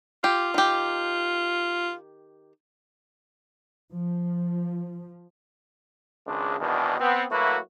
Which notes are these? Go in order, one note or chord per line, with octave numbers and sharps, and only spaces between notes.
F4 G4
D#3 G4
F3
G#1 C#2 C#3 G#3 D4
G#1 E2 B2 D#3 E3 D4
B3 C4
F#3 A3 A#3 E4 F#4 B4